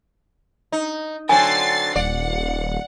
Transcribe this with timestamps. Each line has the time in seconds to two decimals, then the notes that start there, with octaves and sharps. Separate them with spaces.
0.72 D#4
1.29 D3 F#3 C4 G#5 A6 C7
1.96 D#1 D5 F#5